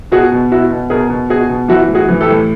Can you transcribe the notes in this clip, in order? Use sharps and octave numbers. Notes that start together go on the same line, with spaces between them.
B2 F#4 G#4
B2
B2 E4 F#4
B2
B2 G#4 A#4
B2
B2 F#4 G#4
B2
E3 E4 F#4
A2
F#4 G#4
E3
G4 A4
A2